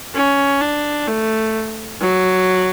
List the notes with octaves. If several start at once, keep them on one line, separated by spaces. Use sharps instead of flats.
C#4
D4
A3
F#3